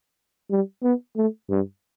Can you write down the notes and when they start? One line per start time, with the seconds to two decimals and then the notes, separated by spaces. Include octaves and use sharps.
0.51 G3
0.83 B3
1.17 A3
1.50 G2